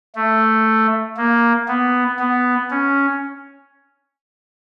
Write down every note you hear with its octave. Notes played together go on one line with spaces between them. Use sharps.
A3
A#3
B3
B3
C#4